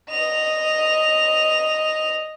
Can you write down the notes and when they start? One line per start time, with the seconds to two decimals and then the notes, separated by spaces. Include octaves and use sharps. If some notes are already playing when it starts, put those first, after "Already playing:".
0.10 D#5 F7